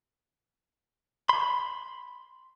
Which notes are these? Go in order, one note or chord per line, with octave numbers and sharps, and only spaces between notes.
B5 C6